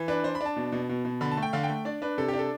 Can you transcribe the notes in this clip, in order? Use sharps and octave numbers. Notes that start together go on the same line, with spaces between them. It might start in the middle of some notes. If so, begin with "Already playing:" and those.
Already playing: E3
D4 B4
D4 C5
B5
D4 A5
B2
B2
B2
B2
D3 B5
A5
A3
G5
D3 F5
G5
A3
D4 D5
D4 B4
C3 A4
G4
D4
A4